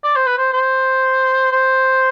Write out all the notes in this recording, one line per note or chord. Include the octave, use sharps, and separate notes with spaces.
D5
C5
B4
C5
C5
C5